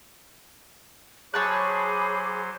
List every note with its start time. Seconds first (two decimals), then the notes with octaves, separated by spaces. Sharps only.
1.34 F#3 G#4 C5 C#5 A5 B5 D6 F#6